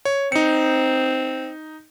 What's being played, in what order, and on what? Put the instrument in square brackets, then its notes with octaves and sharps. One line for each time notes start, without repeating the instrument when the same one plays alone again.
[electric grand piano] C#5
[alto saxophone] C4 [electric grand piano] D#4 C#7